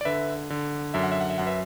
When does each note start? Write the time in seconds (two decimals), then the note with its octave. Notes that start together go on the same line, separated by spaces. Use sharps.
0.01 D5
0.05 D3 B4 E5
0.50 D3
0.94 F#2 E5
1.03 F#5
1.11 E5
1.20 F#5
1.30 E5
1.38 F#2 F#5
1.46 B4 E5